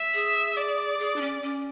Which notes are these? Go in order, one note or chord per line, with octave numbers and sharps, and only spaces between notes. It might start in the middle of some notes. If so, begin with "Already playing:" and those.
Already playing: E5
G#4
D5
G#4
D4
C#4
C#4